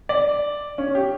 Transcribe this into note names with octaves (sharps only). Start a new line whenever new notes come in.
D5
C#4
G4